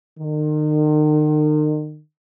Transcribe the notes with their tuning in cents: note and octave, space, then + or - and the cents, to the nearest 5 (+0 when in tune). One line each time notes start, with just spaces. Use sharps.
D#3 -40